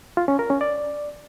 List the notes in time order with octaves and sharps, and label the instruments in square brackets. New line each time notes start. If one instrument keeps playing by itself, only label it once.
[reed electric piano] F4
C#4
A#4
C#4
D5